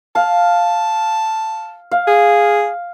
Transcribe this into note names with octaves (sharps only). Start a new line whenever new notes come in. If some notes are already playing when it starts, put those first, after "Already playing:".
F5 A5
F5
G#4